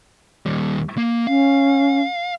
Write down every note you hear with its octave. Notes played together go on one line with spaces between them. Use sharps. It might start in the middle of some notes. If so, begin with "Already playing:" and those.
D#2 G3
A#3
C#4 F5